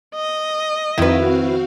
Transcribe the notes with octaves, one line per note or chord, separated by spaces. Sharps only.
D#5
F2 D#3 C4 E4 F#4 B4 F5